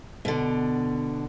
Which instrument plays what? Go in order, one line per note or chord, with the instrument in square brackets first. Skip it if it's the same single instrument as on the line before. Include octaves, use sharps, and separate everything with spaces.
[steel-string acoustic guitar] B2 D3